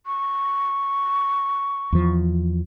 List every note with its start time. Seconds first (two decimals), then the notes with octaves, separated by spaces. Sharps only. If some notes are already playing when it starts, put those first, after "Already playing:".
0.06 C#6
1.92 E2 F3